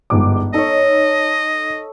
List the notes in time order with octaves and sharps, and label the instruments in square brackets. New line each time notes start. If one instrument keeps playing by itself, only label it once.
[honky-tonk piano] G1 G#2 D6
[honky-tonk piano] D#4 [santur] A4 C#5 [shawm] D#5